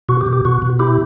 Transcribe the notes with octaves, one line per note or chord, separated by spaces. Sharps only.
B2 F#4
G4
B2
G4
B2 F#4
B2
E4 G4